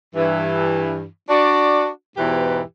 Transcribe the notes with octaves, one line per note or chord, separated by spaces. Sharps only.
G2 E3
D4 F#4 D5
E2 G#2 B2 E3 G4 B4